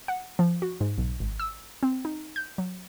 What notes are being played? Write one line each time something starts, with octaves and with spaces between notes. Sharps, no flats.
F#5
F3
F#4
G#2
B1
G#1
E6
C4
D#4
G6
F#3